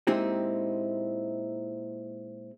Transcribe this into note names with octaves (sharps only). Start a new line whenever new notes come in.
A#2 G#3 C4 D#4 E4 G4